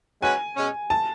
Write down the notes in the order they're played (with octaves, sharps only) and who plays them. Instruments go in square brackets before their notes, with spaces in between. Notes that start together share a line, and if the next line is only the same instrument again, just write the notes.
[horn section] G#3 C#4 F#4 B4 [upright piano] G#5
[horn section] B2 G#3 C#4
[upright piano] A5